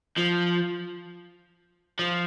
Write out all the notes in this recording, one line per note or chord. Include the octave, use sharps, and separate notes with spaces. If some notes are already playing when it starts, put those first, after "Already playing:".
F3
F3